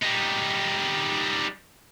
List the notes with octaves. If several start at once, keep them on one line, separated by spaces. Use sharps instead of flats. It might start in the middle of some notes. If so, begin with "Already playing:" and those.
G3 D#4